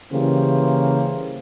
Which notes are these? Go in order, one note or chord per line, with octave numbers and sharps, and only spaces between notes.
C#3 E3 G3 A#3 G4 C5